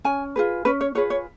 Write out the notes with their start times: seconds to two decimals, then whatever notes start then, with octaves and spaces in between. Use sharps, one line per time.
0.04 C#4 G#5
0.36 F4 G#4 B4
0.65 C#4 B4
0.81 C#5
0.95 F4 G#4 B4 C#5
1.10 C#5